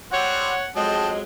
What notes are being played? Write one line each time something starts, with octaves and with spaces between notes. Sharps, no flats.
G3 C4 C#5 F#5
F2 F#3 G#3 A4 D#5 G5